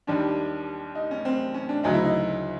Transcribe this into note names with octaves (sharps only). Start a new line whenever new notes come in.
D#2 D#3 G3 D4
D#4
C#4
C4
C#4
D4
D2 C#3 F#3 D#4
E4
D#4